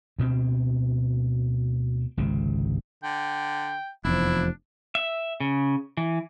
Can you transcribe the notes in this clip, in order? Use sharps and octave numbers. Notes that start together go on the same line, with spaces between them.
D2 B2 C4
G#1 C#2 C3
D3 G5
F1 E2 F3 D4 E4
E5
C#3
E3